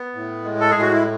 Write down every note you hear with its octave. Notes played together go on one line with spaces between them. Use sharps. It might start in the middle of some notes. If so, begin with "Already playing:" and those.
Already playing: B3
A2
G#3
A4
A2 G#4
F#4
E4